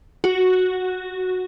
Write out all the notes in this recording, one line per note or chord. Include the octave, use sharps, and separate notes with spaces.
F#4